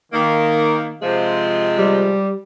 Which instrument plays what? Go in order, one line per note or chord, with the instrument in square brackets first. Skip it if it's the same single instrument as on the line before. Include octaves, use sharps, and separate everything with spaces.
[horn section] D#3 A#3
C3 F3 G#3
[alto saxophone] G3